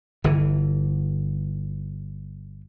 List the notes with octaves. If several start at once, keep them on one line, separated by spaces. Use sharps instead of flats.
G1 D3 E3